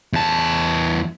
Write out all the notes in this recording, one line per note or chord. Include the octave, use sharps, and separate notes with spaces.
E2 A5